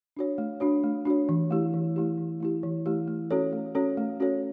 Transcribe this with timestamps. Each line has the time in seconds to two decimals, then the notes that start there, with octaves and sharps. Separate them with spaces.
0.17 D4 F#4 C#5
0.38 A3
0.60 D4 F#4 C#5
0.83 A3
1.05 D4 F#4 C#5
1.29 E3
1.51 A3 E4 G4
1.74 E3
1.96 A3 E4 G4
2.18 E3
2.40 A3 E4 G4
2.63 E3
2.86 A3 E4 G4
3.08 A3
3.31 C#4 F#4 A4 C#5
3.53 A3
3.75 C#4 F#4 A4 C#5
3.97 A3
4.20 C#4 F#4 A4 C#5